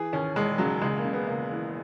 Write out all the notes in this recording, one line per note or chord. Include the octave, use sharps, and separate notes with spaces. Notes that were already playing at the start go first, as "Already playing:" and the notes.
Already playing: E3 G#4
D#2 C#4
E1 G#3
C#3 F#3
C#2 G#3
A#3
C#3
B3
C#2 A#3
E3